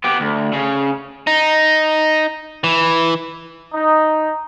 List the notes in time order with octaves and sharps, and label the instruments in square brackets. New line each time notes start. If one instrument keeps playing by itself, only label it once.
[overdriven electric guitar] B3 G4
D2
C#3
D#4
E3
[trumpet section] D#4